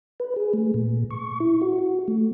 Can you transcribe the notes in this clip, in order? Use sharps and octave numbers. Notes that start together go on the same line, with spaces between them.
B4
G#4
A3
A#2
C#6
E4
F#4
F#4
A3